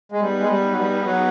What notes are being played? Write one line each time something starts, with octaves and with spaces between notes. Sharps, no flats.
G#3
G3 B3 D#4 G#4 B4
G#3
G3
F#3
G3
F#3